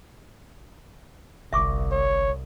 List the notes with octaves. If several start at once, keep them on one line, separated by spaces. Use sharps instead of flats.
G1 C2 E5 C#6 D6
C#5